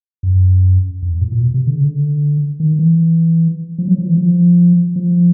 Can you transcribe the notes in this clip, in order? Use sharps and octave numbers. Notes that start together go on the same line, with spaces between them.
F#2
F2
E2
A2
A#2
B2
C3
D3
C#3
D3
D#3
E3
F3
F#3
F3
E3
F3
F3